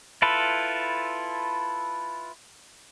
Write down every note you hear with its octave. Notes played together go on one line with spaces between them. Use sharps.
E4 F4 A4 B4